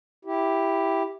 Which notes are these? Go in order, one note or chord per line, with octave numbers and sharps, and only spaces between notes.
E4 G4